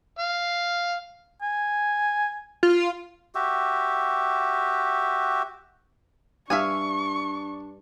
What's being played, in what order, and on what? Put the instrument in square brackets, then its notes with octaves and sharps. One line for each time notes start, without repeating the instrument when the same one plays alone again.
[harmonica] F5
[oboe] G#5
[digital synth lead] F4
[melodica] F#4 G4 E5
[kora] G2 [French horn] D4 [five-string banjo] E5 F5 G#5 [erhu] C#6